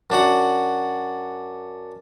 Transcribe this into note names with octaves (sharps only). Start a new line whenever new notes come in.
F#2 D4 F#4 F#5